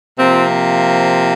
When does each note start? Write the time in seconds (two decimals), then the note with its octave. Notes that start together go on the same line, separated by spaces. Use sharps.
0.19 C3 F3 A#3 C4 F4